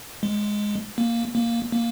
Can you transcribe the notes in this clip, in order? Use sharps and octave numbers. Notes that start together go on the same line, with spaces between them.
G#3
A#3
A#3
A#3